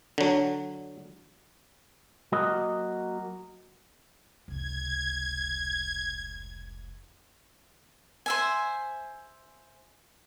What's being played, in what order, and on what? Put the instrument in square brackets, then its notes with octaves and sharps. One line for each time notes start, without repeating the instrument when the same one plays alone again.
[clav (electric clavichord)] D3 F#3
[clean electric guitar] F#3 A#3 F#4 D#5
[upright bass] F1 C#2 [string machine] G#6
[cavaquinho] C5 E5 G#5